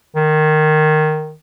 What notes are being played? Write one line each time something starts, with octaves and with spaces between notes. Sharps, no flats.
D#3